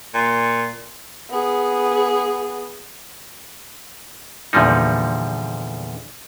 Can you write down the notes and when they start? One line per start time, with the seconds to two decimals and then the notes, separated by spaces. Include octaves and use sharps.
0.14 A#2
1.31 B3 G#4
4.53 E2 A#2 D3 F3 G3 D#4